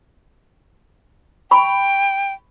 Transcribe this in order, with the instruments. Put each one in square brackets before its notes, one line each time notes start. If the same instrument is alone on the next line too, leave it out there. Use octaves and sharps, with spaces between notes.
[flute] G5 [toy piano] B5 C#6